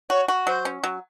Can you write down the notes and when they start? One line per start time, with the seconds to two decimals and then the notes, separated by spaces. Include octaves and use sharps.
0.10 F#4 C#5
0.28 F#4
0.47 F#3 C5
0.65 C#4
0.83 F#3